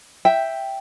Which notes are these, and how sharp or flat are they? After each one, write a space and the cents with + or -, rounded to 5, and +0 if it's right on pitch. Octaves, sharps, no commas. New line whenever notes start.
E5 +0 G5 +0